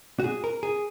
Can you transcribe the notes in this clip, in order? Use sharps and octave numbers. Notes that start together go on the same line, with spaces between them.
F#4
G#4
A#4
G#4